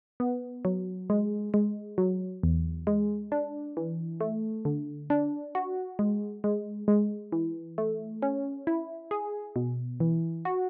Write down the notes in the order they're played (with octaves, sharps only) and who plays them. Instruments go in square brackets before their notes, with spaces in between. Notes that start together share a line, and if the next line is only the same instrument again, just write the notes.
[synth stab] B3
F#3
G#3
G#3
F#3
E2
G#3
D4
E3
A3
D3
D4
F#4
G#3
G#3
G#3
E3
A3
C#4
E4
G#4
B2
E3
F#4